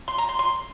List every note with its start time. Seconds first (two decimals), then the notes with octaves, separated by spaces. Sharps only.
0.08 C6
0.18 A#5
0.29 C6
0.39 C6